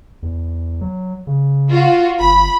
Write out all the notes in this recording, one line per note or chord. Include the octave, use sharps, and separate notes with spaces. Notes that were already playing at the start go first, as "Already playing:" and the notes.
E2
F#3
C#3
F4 F#4
G1 B5